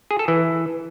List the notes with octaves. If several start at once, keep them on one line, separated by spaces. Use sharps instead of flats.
G#4
A4
E3